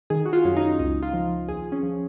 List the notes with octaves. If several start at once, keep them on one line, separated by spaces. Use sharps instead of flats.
D#3 G#4
F#4
F4
F#2 C#4
D#4
C#2 D#4
F4
F3
D#2 G#4
C#4
F3